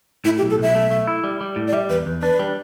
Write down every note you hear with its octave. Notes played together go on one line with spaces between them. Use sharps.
A2 E4
G4
B1
A4
B1 E5
A3
A3
E4
G3
G3
A2
D5
G3 E5
E2 B4
E2
D4 B4
G3